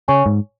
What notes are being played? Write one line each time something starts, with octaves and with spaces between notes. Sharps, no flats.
C#3 C#5 G#5 C#6
G#2